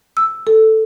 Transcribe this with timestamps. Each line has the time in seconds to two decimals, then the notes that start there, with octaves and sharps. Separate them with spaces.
0.17 E6
0.47 A4